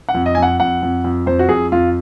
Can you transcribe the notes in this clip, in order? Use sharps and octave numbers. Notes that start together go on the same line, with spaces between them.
F#5
F2
D#5
G#5
F2
F#5
F2 F#5
F2
F2
F2 C5
F#4
F2 G#4
F2 F4